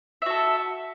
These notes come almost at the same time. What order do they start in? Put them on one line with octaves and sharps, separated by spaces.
E5 F#4 A4